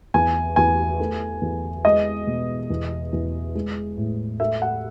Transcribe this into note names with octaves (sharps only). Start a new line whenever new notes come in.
E2 G#5
E2 G#5
A3
E2
G#3 D#5
B2
E2
E2
G#3
A2
A3 E5
F#5